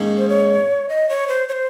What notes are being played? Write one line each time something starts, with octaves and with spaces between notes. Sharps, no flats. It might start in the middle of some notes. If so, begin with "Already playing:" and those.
Already playing: G#2 D#3 A#3 C#4
C5
C#5
D#5
C#5
C5
C#5
C5